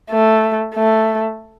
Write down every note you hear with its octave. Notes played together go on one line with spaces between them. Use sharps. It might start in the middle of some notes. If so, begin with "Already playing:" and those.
A3
A3